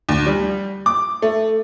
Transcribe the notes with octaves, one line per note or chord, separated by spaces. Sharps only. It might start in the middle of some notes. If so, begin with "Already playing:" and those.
D2
G3
D6
A3